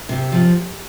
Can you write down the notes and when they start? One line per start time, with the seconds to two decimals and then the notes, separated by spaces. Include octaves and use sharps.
0.09 C3
0.32 F3